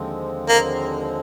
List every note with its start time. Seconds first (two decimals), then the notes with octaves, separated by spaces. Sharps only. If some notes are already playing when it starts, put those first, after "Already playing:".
Already playing: D#2 D3 F3 G#3 C4
0.49 A#3